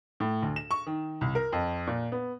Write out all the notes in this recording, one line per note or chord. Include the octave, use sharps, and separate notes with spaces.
A2
D2
E7
C#6
D#3
C2
A#4
F2
A#2
B3